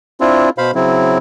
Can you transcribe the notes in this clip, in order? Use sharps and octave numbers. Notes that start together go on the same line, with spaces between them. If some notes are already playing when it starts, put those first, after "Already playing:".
C4 D4 E4 F4
B2 C5 F5 B5
C#3 F#3 C4 E4